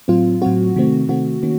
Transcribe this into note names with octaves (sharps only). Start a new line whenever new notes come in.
A2 F#3 C4 F4
A2 F#3 C4 F#4
C3 D#3 A3 C4
C3 D#3 A3 C4 F#4
D#3 A#3 C#4